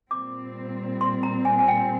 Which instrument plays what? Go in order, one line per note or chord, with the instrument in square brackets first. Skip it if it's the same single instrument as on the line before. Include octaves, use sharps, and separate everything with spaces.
[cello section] A#2 G3 C4 [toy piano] D6
[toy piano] C6
A#5
G#5
G#5
G5